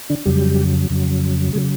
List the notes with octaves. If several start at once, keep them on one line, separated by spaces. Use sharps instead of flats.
D3 D4
F2 C#3 F#3 G3 G4
F2 C#3 F#3
C#3 F#3 G#3 G#4